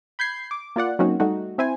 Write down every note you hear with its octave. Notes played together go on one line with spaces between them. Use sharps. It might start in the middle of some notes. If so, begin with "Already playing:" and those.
B5 G6 G#6 C7
D6
A#3 F4 D5 F#5
F#3 A#3 C4 C#4 D#4 F#4
G3 A3 D#4 F#4
C4 E4 C5 G#5